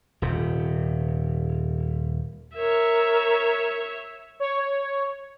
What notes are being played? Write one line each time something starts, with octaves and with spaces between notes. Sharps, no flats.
D#1 C3
A#4 C#5 E5
C#5